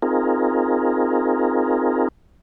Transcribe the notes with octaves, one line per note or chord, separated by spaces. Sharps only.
C4 D#4 F4 G#4 A#4